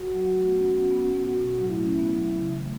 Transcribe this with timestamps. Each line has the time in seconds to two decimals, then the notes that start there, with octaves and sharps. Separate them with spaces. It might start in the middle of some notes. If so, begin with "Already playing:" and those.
Already playing: F#4
0.13 F#3
0.35 A3
0.46 B3
0.57 C#4
0.69 B3
0.80 C#4
0.91 B3
1.02 C#4
1.14 B3
1.24 A2 F#4
1.35 B2
1.47 A2
1.58 F#3
1.69 A3 E4
1.84 C#4
1.99 B3
2.14 F#3
2.36 C#3
2.47 E3
2.58 A3